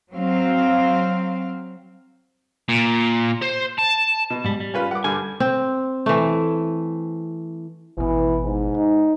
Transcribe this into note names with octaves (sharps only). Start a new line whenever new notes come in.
F#3 C4 F5
A#2
C5
A5
B2
G#2 G3
G3
C#4 F4 B4
F#5 D6
G2 D3 G3 G#5
C4
E3 A3
G#1 B2 E3
G#2
D#4